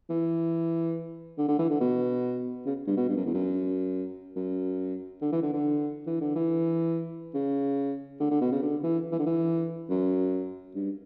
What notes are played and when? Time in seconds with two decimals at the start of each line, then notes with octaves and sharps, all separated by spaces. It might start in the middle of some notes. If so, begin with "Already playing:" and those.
0.10 E3
1.38 D3
1.48 D3
1.59 E3
1.70 D3
1.81 B2
2.66 C#3
2.87 G2
2.97 B2
3.09 G2
3.17 F#2
3.26 E2
3.34 F#2
4.36 F#2
5.22 D3
5.32 E3
5.42 D3
5.53 D3
6.07 E3
6.21 D3
6.35 E3
7.34 C#3
8.20 D3
8.31 D3
8.41 B2
8.51 C#3
8.62 D3
8.83 E3
9.12 E3
9.19 D3
9.26 E3
9.90 F#2
10.75 G2